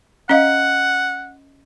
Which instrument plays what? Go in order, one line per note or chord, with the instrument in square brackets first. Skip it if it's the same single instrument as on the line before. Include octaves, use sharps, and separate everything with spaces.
[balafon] C#4 D#5 F5 [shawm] F#5